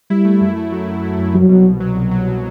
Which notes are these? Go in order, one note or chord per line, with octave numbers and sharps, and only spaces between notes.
G3 E4
A3
F#2
A3
F#3
F#2
A3
F#2
C2 F#3
B2
C2
F#3
C2
F#3
B2